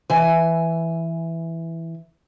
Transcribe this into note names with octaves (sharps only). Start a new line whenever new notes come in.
E3 G#5